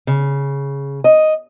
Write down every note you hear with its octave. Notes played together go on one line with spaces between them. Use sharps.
C#3
D#5